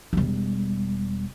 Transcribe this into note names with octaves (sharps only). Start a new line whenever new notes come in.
E1 G3